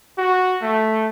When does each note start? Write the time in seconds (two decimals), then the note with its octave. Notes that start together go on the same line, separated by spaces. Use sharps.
0.18 F#4
0.62 A3